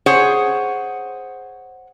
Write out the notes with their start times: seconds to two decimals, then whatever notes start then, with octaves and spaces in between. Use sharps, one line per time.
0.06 G#4 C5 C#5 F#5